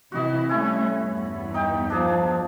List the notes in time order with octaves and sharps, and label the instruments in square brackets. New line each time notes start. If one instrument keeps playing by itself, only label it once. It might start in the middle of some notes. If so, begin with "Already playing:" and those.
[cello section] C3 E3 E4 [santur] F#4 D#5
[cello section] G3 A3 C#4 [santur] E4 G#5 C#6
[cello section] E2 G2 B3
[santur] D#4 G5
[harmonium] F3 [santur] D4 G#4 A5